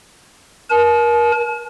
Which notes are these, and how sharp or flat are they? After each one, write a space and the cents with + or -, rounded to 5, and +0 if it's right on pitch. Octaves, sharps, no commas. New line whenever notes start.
A#4 +30 A5 -45